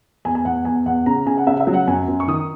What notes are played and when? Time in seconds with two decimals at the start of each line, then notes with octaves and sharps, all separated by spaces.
0.25 E2 G#5
0.35 G#5
0.45 E2 F#5
0.65 E2 G#5
0.86 E2 F#5
1.06 C#3 A#5
1.26 C#3 G#5
1.38 F#5
1.47 C#3 E5
1.60 E5
1.67 F#3
1.74 F#5
1.87 F#2 G#5
2.08 F#2
2.20 C#6
2.28 D#3 D#6